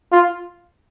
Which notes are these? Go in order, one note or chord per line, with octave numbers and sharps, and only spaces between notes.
F4